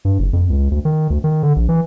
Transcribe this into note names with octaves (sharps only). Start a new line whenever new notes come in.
G2
F#1
F2
C#2
D2
D#3
D2
D#3
D3
A#1
E3